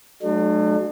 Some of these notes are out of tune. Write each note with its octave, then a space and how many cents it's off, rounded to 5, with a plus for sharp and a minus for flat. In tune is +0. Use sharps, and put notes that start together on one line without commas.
F#3 +5 A3 -30 D4 +45